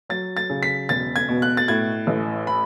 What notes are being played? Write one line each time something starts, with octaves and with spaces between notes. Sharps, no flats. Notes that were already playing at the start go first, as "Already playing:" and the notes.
F#3 A6
A6
C#3
B6
E1 A6
G#6
B2
F#6
A6
A2 G#6
A1
B5